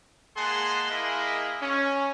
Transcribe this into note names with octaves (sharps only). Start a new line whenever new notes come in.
G#3 A#3 G#4 F#5 A5 C6
A#3 E4 G#4 A#4 D#5 B5
C#4